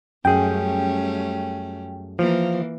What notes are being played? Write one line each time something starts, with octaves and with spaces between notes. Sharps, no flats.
F#2 G3 A3 C#4 G#4 G5
E3 F3 A#3